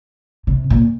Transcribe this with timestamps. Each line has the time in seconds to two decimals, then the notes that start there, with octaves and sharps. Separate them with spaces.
0.47 C3
0.70 A#2